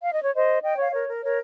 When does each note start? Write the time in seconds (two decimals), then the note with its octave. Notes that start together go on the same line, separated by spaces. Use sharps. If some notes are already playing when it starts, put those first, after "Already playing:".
0.02 F5
0.12 D#5
0.24 C#5
0.34 C5 D#5
0.62 D#5 G5
0.78 C#5 F5
0.92 A#4 C#5
1.08 A#4
1.23 A#4 C#5